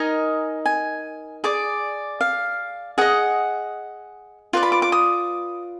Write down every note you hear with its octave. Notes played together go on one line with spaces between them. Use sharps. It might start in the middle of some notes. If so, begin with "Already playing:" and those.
Already playing: D#4 A#4 D#5 G#5
G#5
G#4 D5 D6
F5
G#4 D#5 F#5
F4 B4 D5
B5
D6
D6
D#6